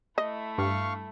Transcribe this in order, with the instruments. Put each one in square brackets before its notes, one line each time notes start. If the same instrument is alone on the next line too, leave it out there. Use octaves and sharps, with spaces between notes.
[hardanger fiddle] A3 E4 [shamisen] D#5
[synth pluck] G2 [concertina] F5 C#6